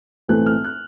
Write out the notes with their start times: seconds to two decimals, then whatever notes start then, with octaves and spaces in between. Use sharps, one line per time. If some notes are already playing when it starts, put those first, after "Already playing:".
0.28 B1 A2 E3 A3 C4 F#6
0.46 F6
0.64 F#6